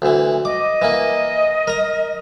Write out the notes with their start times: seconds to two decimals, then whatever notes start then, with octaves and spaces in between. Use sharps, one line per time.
0.02 D2 E3
0.45 D#5 D6
0.82 E3 A#3
1.67 A#4 A#5